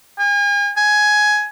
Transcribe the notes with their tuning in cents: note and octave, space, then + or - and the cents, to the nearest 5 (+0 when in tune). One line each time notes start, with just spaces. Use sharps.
G#5 -40
G#5 +10